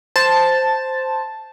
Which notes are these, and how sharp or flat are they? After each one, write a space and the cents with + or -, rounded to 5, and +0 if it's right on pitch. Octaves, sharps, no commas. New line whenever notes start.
C5 +0 A5 +0